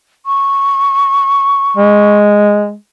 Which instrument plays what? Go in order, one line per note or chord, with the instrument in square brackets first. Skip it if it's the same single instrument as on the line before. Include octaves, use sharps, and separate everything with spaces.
[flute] C#6
[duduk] G#3